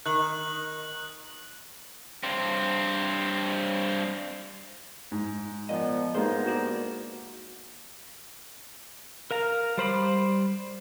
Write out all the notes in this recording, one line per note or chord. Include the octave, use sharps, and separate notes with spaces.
D#3 F#6 F#7
G2 C4
G#2
A#2 F3 B3 D#5
G2 G#3 A#3 B3 D#4 C5
F#4 C5 D5
A#4 F5 A#5
G3 C5 B5 D6